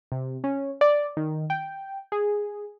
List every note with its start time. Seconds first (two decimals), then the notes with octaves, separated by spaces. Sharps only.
0.12 C3
0.44 C#4
0.81 D5
1.17 D#3
1.50 G5
2.12 G#4